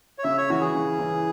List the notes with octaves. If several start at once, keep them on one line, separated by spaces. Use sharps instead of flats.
C#5
C#3 E5
C#5
E3 C#4 E4 F#4
G#4
C#3
E3 C#4 E4